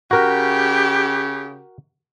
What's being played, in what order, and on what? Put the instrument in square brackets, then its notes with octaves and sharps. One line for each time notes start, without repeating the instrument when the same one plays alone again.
[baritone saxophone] C#3 [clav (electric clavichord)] F#4 A#4 [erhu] G4